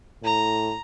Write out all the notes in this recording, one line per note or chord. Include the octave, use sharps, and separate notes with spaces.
A2 A#5